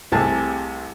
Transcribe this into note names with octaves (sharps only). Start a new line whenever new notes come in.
C2 C3 A3 G4 G#4 A5